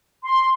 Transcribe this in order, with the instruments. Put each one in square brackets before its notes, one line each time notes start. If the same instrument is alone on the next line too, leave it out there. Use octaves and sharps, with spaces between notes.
[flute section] C6